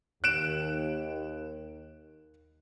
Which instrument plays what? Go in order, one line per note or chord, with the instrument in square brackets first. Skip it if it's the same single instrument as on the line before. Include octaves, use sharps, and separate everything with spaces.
[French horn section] D#2 [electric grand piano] F#6 D7 E7